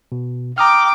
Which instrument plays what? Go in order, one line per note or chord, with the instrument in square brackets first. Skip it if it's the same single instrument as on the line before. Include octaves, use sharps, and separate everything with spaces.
[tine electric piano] B2
[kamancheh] G5 D6 [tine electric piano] A#5 D#6 F6